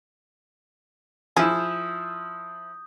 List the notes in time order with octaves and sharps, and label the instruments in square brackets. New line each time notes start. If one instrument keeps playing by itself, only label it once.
[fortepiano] F3 E4 [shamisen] G#4 [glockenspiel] D#6 G6